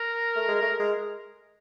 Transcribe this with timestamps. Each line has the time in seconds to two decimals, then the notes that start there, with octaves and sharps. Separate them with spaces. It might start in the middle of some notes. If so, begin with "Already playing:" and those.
Already playing: A#4
0.36 A3
0.48 G#3
0.62 A3
0.79 G#3